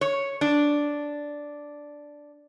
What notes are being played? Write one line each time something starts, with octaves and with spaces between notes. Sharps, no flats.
C#5
D4